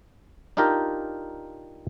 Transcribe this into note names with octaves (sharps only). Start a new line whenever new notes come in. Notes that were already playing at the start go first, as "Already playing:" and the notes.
D4 D#4 F4 G4 A#4